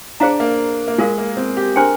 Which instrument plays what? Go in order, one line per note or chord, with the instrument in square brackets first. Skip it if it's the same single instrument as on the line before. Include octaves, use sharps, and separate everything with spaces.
[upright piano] D4 [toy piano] G#4 C5 F5 A#5
[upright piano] A#3
A#3
[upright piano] G#3 [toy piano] F4 A#4 F5
[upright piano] A#3
C4
G4
[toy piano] D4 G#4 C5 G5 C6 [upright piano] A#4